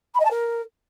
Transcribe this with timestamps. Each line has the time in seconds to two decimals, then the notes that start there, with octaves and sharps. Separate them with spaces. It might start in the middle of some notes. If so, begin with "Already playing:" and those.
0.14 B5
0.19 D#5
0.25 A5
0.30 A#4